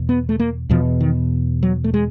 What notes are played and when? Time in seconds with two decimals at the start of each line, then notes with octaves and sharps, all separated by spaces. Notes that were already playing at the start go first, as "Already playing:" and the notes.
Already playing: E2 B2
0.09 B3
0.29 A3
0.39 A#3
0.70 E2 B2 F3
1.01 D#3
1.63 F#3
1.84 A3
1.94 G#3